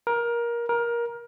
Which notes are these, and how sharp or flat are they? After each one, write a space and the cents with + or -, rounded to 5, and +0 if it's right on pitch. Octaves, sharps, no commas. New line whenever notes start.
A#4 +20
A#4 +20